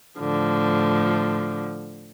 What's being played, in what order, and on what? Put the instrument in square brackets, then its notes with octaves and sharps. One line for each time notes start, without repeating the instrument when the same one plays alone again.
[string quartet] A2 D3 F3